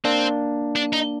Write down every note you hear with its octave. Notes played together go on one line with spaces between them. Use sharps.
A#3 C4 D4
D4
D#4